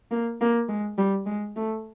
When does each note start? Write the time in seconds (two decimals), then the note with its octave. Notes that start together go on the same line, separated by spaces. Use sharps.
0.11 A#3
0.41 A#3
0.69 G#3
0.98 G3
1.26 G#3
1.56 A3